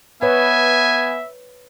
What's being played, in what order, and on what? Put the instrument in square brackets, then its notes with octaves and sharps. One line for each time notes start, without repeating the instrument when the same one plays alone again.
[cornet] B3 [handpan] B4 C#5 [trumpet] E5 [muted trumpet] G#5